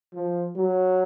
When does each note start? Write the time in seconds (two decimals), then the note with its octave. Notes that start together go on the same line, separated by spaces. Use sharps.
0.14 F3
0.56 F#3